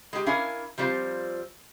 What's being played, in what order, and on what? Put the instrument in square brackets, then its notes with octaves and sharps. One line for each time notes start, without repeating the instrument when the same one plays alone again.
[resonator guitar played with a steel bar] G#3 G4
C#4 D4 E4 A#4 F5 G#5
F3 G3 C4 F4